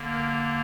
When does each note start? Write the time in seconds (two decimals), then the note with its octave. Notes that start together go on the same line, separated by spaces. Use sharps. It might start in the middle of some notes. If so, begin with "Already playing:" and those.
Already playing: D3 A#3
0.10 A#4